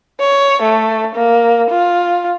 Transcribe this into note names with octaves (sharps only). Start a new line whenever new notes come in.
C#5
A3
A#3
F4